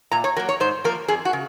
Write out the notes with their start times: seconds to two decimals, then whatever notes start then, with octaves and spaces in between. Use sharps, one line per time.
0.12 A#2 A#5
0.24 C#5
0.36 F#3 A#3 A#4
0.49 C#5
0.60 G#2 C5
0.84 F3 A#3 A#4
1.08 F2 G#4
1.25 F#4
1.33 C#3